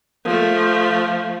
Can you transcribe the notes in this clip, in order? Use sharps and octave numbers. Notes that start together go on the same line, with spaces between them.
F3 A3